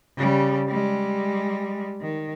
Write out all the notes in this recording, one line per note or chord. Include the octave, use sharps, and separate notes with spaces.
C#3 G3
G3 G#3
D#3